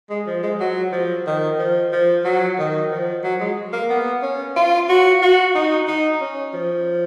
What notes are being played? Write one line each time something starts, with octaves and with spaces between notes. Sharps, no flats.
G#3
F3
G#3
F#3
F3
D#3
F3
F3
F#3
D#3
F3
F#3
G#3
A#3
B3
C#4
F4
F#4
F#4
D#4
D#4
C#4
F3